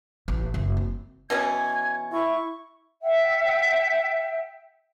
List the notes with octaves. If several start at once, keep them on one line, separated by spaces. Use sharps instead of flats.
A1
F#1
C4
B2 E3 C#4 G#6
E4 C#6
E5 F#5 G5